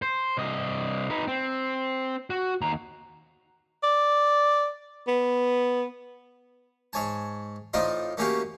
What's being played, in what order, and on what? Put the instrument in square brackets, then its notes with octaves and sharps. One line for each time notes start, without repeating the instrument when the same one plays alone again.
[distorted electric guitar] C5
C2 D#5
D#4 B4
C4
F#4
D#2 A#5
[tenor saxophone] D5
B3
[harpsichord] G#2 C#5 G#5 A5
A2 C4 D#4 F4 D5 D#5
A3 A#3 C#4 F#4 G4 F5